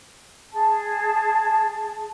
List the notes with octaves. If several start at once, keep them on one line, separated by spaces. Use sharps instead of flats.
G#4 A5